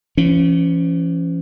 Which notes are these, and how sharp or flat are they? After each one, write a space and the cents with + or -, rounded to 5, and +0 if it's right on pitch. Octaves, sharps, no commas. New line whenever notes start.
E3 +45 C#4 +0